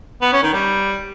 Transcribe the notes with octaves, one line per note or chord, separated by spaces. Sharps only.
B3
C#4
D#3
G3